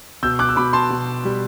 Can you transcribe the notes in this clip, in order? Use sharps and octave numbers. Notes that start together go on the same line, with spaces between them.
B2 E6 G6
D6 F#6
E6
B2 B5 D6
A5 C6
B2
G3